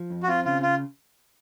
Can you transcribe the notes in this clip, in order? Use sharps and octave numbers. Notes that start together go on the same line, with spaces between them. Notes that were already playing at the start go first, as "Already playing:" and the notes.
Already playing: F3
F2
F#4
C4 F4
C#3 F4
F4